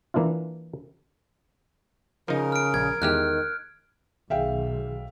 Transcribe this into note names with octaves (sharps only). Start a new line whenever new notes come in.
E3 A#3 D4 E4 F4
C#3 F3 D#4 A#4
F6 D7
A#1 G#6
E2 D#3 G#3 G4 F6 F#6
B1 D#3 G#4 E5 F5 G5